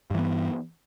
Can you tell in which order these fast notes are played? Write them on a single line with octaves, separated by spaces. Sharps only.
G2 E3 B3